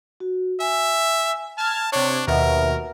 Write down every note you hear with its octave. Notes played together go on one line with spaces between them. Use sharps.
F#4
E5 G#5
A5 F6 G#6
C3 D4 C#5 C#6
D#2 B2 A#4 B4 E5 F#5